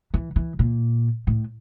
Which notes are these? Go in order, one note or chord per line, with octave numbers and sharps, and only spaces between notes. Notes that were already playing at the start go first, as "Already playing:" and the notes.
E3
E3
A#2
A2